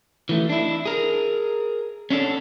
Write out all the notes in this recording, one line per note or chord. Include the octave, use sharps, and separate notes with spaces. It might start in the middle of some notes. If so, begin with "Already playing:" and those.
E3 A3
D4 E4
G#4 A#4
C#4 D4 A4